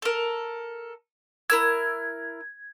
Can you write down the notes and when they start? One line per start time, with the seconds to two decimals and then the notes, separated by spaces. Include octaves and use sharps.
0.02 A4 A#4
1.50 E4 A#4 E6 G#6